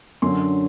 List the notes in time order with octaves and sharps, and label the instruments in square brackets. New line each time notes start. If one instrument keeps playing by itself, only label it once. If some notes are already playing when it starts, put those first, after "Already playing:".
[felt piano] F#2 D3 F#3 C6